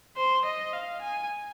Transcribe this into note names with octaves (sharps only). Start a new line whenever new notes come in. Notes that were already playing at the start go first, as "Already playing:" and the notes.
C5
D#5
F5
G#5